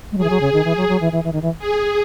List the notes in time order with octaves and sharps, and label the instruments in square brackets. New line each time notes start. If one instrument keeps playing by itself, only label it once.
[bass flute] G#3
[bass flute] F#3 [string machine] G#4
[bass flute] E3
F#3
C#3
D#3
E3
F#3
F#3
E3
E3
E3
D#3
E3
[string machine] G#4